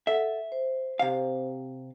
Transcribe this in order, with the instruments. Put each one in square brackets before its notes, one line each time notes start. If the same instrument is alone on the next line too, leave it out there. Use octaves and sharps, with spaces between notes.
[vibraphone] A4 F#5 [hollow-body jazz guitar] E5
[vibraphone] C5
[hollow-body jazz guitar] C3 F5